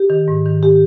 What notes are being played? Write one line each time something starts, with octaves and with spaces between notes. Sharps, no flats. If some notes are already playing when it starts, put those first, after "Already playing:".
Already playing: G4
D#3
G#2
D#3
G4